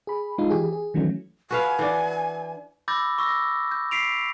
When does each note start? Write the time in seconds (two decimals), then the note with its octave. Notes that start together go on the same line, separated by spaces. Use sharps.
0.07 G#4 B5
0.38 G#3 D#4 F4
0.50 E3 G4 G#4
0.73 G#4
0.94 D#3 E3 F#3 A3 C#4
1.51 F#4 B4 F5 G#5
1.79 E3 D4
2.88 B5 D6 E6 G6 A6 A#6
3.18 C#6 E6 A#6
3.71 G6
3.91 B6 C7 D7 F7